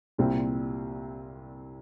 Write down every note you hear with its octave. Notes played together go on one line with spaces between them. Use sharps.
C2 A#2 G3 C4